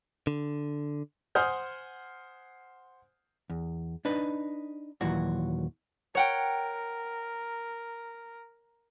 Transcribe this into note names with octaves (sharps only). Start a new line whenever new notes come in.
D3
C5 F#5 G#5 D#6 F6 G6
E2
D4 D#4 B4
D#2 A#2 E3 F#3 F#4
A#4 C#5 F#5 G5